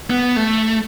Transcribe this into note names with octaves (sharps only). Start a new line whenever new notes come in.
B3
A3